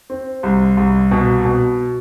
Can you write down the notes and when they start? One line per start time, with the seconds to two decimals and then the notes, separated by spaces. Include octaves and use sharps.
0.10 C4
0.43 C2
0.77 C2
1.11 B2
1.45 B2